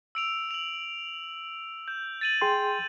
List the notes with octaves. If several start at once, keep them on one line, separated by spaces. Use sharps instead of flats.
E6 D7 F7
F7 F#7
G6
A6 D#7 F#7
G#4 G5 C6